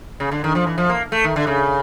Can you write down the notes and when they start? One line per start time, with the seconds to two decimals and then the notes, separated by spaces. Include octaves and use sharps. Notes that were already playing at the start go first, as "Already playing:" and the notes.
0.20 C#3
0.32 D3
0.44 D#3
0.55 F3
0.67 E3
0.78 F3
0.90 A#3
1.12 A3
1.24 D#3
1.36 D3
1.47 C#3